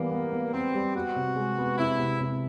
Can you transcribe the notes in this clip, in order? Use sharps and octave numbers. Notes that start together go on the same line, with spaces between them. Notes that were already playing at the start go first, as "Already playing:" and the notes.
Already playing: E3 G3 A#3 B3
B3
B3
B3 C4
G3
B3 F#4
C3
G#3
B3
C3 E4
C3
C3